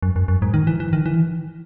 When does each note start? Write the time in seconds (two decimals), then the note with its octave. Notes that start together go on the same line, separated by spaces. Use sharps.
0.03 F#2
0.16 F#2
0.28 F#2
0.42 G#2
0.54 D#3
0.67 E3
0.80 E3
0.93 D#3
1.06 E3